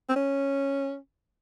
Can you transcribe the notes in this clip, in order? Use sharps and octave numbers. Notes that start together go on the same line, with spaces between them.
C4
C#4